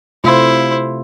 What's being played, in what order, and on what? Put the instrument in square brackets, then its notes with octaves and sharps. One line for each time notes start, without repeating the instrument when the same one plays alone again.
[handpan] C3 A3 F4 [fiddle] E4 C5